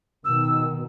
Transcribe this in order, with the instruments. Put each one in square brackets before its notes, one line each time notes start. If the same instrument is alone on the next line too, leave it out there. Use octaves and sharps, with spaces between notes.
[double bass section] B2 D#3 [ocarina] E6